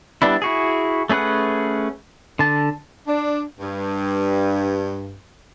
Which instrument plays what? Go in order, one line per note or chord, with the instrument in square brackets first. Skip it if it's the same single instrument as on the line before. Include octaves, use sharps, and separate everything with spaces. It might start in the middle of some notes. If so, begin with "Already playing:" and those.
[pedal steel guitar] G3 B3 D4 E4
E4 F#4 G#4
A3 C#4 G#4 B4 F#5
D3 A5
[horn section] D4
G2